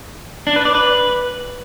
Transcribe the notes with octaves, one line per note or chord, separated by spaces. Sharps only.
D4
B4
D5
B4